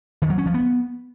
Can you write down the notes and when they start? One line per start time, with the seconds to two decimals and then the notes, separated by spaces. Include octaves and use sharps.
0.22 D#3
0.30 F#3
0.38 C#4
0.46 F3
0.54 B3